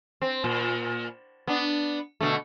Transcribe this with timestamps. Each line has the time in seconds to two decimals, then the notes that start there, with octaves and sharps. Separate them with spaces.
0.22 C4
0.44 A#2
1.47 B3 D4
2.20 B2 D3 A3